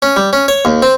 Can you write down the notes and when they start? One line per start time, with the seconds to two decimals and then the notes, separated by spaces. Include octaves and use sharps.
0.02 C#4
0.16 G3
0.33 C#4
0.48 C#5
0.65 D#2
0.82 C4